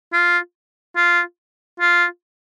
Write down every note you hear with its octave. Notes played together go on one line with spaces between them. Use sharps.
F4
F4
F4